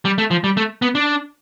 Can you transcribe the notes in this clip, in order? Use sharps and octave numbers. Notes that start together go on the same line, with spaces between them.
G3
A3
F3
G3
A3
B3
D4